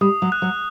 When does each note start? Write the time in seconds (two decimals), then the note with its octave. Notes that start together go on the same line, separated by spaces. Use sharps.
0.01 G3 D#6
0.22 F#3
0.32 F#6
0.42 F#3